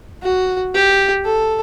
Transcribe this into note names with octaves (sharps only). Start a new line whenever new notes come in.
F#4
G4
A4